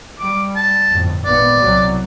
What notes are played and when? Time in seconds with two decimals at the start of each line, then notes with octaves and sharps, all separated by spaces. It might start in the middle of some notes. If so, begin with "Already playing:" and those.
0.20 G3 D6
0.56 A5
0.89 G1 F2 A2
1.25 G#1 A#2 B3 D5
1.59 C2 B2 F#3